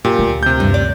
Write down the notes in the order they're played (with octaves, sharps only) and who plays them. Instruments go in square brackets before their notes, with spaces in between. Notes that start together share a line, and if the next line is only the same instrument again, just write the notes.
[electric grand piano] A#2 [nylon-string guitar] G4
[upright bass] D2
[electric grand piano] C3 G6
[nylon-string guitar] G2
D5